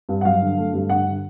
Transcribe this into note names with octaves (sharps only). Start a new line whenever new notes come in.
G2
F#5
F#3 F5
D3
A3
G2
D3 F#5
D3